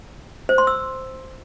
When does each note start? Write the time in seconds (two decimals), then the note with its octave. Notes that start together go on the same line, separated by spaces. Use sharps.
0.49 C5
0.58 C6
0.67 E6